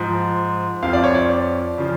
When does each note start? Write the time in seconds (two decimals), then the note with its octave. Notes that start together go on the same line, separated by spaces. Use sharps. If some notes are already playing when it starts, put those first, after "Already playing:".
Already playing: G#2 F3
0.83 F2 F3 F5
0.93 D5
1.04 C#5
1.14 D5
1.78 C#3 F3